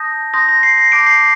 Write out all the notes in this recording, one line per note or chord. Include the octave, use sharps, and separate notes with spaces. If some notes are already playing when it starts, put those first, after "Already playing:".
Already playing: A5 D#6 G6 A#6
C6 D#6 G6 A#6
A#6
C7
A#6
A5 D6 G6 D7
C7